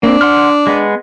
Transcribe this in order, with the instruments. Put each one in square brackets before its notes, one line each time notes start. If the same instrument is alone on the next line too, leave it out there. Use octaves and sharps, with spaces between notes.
[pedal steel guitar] A#3 C4 [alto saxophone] D4
[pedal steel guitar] F#5 C6 F6
G#3 B3